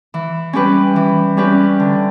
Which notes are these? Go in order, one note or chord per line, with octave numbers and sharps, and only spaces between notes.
E3
G3 C#4 G4 B4
E3
G3 C#4 G4 B4
D3